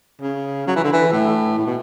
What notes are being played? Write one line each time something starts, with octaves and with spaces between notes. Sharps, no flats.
C#3
F#3
E3
D3
E3
A2
A2
B2